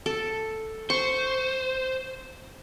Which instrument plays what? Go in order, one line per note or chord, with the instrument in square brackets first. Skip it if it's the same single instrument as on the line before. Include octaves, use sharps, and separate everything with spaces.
[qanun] A4
[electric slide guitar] C5 [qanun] C#6